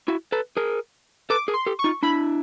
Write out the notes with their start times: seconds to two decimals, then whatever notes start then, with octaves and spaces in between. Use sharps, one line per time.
0.08 E4 F#4
0.32 A4 B4
0.57 G#4 A#4
1.30 A4 B4 D6
1.48 G#4 A#4
1.54 C6
1.66 G4 A4
1.79 C#6
1.84 D#4 F4
2.03 D4 E4 B5